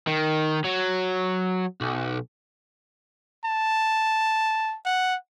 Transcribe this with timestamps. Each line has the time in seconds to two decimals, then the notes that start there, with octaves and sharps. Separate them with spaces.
0.07 D#3
0.65 F#3
1.81 B1
3.45 A5
4.85 F#5